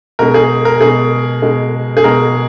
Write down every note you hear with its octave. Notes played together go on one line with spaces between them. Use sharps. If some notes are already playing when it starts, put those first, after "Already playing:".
B2 G#3 A#4
G#4
A#4
B2 G#3 G#4
B2 G#3
G#4
B2 G#3 A#4